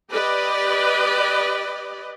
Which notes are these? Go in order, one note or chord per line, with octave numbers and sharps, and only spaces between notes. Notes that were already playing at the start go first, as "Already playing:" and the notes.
G4 B4 D5 D#5